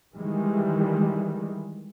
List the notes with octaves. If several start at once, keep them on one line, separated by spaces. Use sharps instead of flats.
D#3 E3 G3 G#3